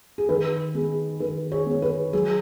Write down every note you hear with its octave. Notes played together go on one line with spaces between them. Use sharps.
G#4
D#3 B4
B3 D#4 G#4
D#3 B4
G#4 C#5
B3 D#4
B4
F#3 G#4